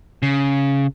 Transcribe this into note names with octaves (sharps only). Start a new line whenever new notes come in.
C#3